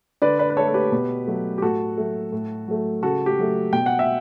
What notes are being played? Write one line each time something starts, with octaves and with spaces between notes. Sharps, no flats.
D3 B4 D5
B4 D5
B4
A3 A4 C#5
A4
G4 B4
B2
F#3 A3
G4
A2 F#4 A4
F#3 A3
A2
F#3 A3
C#3 F#4 A4
G4
F#3 A3
B2 G5
F#5
E5